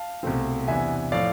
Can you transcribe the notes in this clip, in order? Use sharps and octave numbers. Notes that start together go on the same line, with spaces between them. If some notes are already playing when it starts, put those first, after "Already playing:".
Already playing: F5 A5
C2 B2 A3 C4
E2 C3 E3 B3 D4 E5 G#5
A2 F3 D5 F5